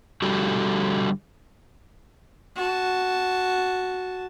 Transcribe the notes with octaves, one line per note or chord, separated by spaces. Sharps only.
D3 G3 F#4 G4 A4
F#4 A5